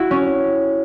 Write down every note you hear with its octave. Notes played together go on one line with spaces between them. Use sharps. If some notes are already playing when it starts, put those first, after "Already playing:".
Already playing: E4 F#4
C#4